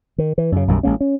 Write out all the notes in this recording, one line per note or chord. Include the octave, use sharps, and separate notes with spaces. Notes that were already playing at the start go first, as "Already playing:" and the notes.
D#3
E3
F#2 C#3
B1 F#2 D#3 G3
A1 G#3 A#3 C#4
C#4